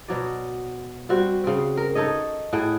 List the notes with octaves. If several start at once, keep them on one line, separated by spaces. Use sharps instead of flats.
B2 F#3 D5
G3 C4 F#4
C#3 C4
A#4
D#4 A4 C#5 D#5
A2 G#4 F#5 G5